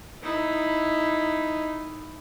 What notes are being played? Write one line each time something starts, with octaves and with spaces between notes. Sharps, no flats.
D#4 E4